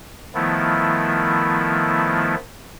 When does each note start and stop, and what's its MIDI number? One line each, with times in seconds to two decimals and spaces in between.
0.35 2.35 51
0.35 2.35 53
0.35 2.35 57
0.35 2.35 59
0.35 2.35 64